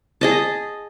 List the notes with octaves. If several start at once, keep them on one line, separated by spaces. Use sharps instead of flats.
G#4 D#5 A5